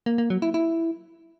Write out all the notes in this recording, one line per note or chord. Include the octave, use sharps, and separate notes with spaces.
A#3
A#3
F#3
E4
E4